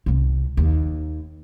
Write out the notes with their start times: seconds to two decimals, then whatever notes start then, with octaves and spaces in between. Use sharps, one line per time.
0.06 C2 C#4
0.57 D#2